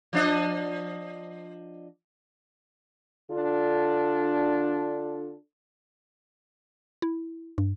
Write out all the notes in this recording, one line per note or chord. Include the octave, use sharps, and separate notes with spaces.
F3 D4 D#5
D3 D4 F4 A4
E4
G2